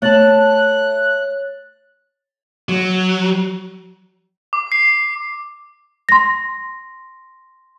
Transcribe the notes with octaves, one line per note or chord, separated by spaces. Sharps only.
A3 C#5 A5 F#6 A6 F#7
F#3
D6
C7
C6 A#6